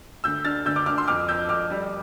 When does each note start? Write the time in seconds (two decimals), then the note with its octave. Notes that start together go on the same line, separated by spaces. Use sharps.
0.24 D2 E6 G6
0.45 D3 F6 A6
0.65 D2 E6 G6
0.76 D6 F6
0.86 D2 D6 F6
0.98 C6 E6
1.08 F2 D6 F6
1.29 F2 E6 G6
1.49 F2 D6 F6
1.71 G3